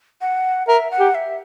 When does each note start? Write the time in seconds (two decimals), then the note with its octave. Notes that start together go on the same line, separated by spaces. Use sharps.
0.21 F#5
0.67 A#4 E5
0.91 F#5
0.99 G4
1.15 E5